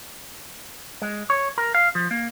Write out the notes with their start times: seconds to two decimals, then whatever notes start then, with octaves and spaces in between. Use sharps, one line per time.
1.02 G#3
1.30 C#5
1.58 A#4
1.74 F5
1.95 F3
2.11 A#3